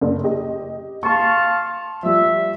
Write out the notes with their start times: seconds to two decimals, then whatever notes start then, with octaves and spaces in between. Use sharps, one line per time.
0.01 F#1 D5
0.24 G4 D#5
1.03 F5 A5 C6 C#6
2.03 F3 G3 E5